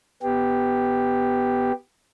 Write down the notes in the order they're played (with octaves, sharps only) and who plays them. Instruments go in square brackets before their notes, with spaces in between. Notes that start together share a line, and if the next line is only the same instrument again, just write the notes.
[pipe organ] B3 G4